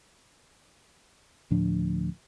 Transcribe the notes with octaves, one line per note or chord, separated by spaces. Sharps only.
D2 A2 F3 D4